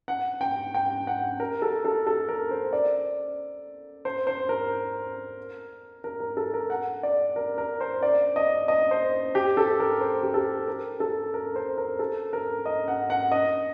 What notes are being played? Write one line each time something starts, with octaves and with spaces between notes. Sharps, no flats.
F#5
G5
G5
F#5
A#4
A4
A4
A4
A#4
C5
D5
C5
C5
A#4
A#4
A#4
A4
A#4
F#5
D5
A#4
A#4
C5
D5
D#5
D#5
C5
G4
A4
A#4
C5
G4
A4
A#4
A4
A#4
C5
A#4
A4
A#4
D#5
F#5
F#5
D#5